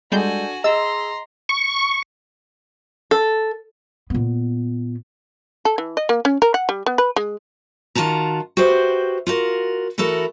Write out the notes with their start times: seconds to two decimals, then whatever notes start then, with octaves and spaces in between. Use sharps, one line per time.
0.12 G3 G#3 D4 F#4 A4 G#5 G6
0.64 G#4 D#5 A#5 C6 E6
1.49 C#6
3.11 A4
4.10 A#2 B3
5.65 A4
5.78 E3
5.97 D#5
6.09 A#3
6.25 C#4
6.42 A#4
6.54 F#5
6.69 G3
6.86 B3
6.98 B4
7.16 G#3
7.95 D#3 F4 F#4 A5 A#5
8.57 F#4 G4 B4 C5 E5
9.27 F4 F#4 A#4
9.98 E3 E4 F#4 A4 A#4